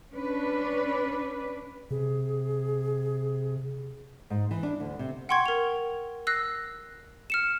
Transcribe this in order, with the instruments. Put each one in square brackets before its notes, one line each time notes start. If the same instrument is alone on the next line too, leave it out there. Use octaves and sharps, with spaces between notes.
[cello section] C#4 D4 B4
[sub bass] C3 [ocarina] G#4
[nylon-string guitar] G#2
E3
D4
D2
C3
[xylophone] F#5 G5 C6 C#6 G#6
A#4 F7
E6 F#6 A#6 C7
F6 C#7 E7